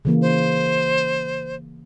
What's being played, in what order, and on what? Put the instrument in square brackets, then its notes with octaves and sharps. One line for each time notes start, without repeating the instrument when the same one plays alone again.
[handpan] C#3 E3 A#3
[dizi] C5